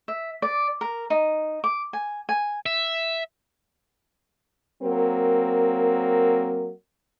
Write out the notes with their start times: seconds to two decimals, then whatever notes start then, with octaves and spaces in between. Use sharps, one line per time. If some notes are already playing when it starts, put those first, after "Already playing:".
0.08 E5
0.42 D5
0.81 A#4
1.10 D#4
1.64 D6
1.93 G#5
2.29 G#5
2.66 E5
4.83 F#3 A#3 C4 A#4